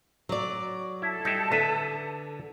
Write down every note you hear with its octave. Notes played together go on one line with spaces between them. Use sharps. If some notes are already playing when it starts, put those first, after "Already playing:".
F#3 D5
E4 A4
G3 D#4 E4
D3 B4 E5 A5